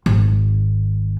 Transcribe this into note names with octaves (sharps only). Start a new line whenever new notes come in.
G#1